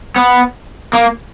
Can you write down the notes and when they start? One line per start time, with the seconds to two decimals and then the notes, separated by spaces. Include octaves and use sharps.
0.16 B3
0.93 A#3